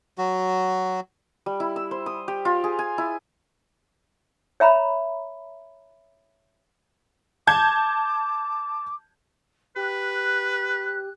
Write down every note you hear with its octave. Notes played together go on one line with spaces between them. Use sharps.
F#3 F#4
G3
E4
E6
C5
D#6
G4
F4
G#4
G#5
E4
C#5 E5 A#5 B5
A5 D6 G6 G#6
G4 B4 F#6